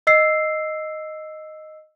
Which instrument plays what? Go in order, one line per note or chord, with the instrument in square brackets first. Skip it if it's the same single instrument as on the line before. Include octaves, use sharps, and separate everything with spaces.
[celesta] D#5 E6 C7